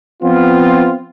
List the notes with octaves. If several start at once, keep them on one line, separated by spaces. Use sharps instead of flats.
F3 B3 C4 F4